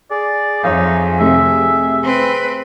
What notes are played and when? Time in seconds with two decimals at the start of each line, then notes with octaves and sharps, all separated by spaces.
0.11 G#4 D5
0.64 F2 D#4 C#5 E5 F5
1.20 C3 D#3 A3 E5
2.03 C4 B4